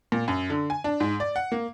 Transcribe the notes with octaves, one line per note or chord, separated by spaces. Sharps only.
A#2
F#2
D3
G#5
D4
G#2
D5
F#5
A#3